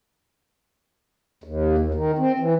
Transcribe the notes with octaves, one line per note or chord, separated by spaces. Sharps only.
D#2
D#2
D#3
C4
E3